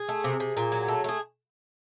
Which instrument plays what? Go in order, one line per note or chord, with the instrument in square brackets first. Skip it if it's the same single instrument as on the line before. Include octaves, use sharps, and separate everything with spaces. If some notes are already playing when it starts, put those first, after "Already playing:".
Already playing: [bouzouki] G#4
A3
C3
C3
A#2
F#3
A3
A3 G#4